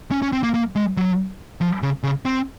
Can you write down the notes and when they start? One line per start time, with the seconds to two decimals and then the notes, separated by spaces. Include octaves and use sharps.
0.11 C#4
0.22 C#4
0.33 C4
0.43 A#3
0.54 A#3
0.76 G#3
0.97 F#3
1.61 F3
1.82 C#3
2.03 C#3
2.25 C4